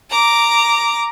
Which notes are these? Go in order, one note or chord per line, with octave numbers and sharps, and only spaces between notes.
A#5 D6